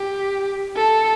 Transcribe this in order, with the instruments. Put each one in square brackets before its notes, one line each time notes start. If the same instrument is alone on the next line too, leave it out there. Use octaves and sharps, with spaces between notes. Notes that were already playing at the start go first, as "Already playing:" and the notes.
Already playing: [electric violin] G4
A4